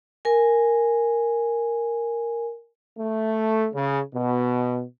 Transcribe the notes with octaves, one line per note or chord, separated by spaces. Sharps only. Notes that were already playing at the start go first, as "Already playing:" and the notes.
A#4 G#5
A3
C#3
B2